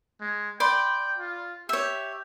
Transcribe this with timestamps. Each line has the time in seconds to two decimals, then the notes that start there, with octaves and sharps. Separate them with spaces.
0.21 G#3
0.60 D5 G5 B5 C6
1.18 F4
1.69 G4 C#5 E5